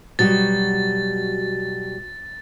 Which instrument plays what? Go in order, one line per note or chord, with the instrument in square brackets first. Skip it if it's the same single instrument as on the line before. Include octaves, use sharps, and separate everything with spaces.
[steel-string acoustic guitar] B2 F#3 G3 [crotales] A6